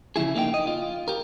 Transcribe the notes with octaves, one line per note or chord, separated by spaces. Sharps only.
C#3 F3 E4 G#4
A#3 D#4 E5 G5
D#5
F4
G4 A#4